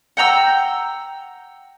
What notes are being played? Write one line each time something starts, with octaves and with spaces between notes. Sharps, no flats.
F#5 G5 A#5 E6